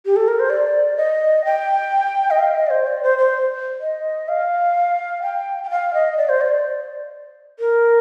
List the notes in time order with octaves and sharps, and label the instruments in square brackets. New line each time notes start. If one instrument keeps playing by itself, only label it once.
[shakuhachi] G4
A4
A#4
C5
D5
D#5
G5
D#5
F5
D#5
D5
C5
D5
C5
C5
D#5
F5
G5
G5
F5
D#5
D5
C5
D5
A#4